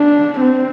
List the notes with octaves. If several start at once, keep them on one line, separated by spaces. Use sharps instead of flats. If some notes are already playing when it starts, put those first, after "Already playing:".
Already playing: D4
C4